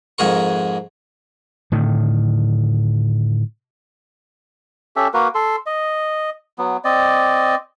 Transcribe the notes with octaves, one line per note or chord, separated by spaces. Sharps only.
F2 G#2 G#4 A#4 C#6
A2 D3 D#3
C#4 G4 A4 E5
A#3 F#4 A#4 B4
A4 C6
D#5
F#3 B3
C4 D5 D#5